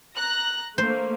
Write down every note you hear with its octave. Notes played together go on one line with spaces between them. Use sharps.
A#5 F#6 A#6
A3 A#3 C5